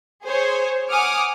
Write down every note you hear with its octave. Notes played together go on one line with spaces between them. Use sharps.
G#4 C5 C#5
F#5 G#5 D6 D#6 F6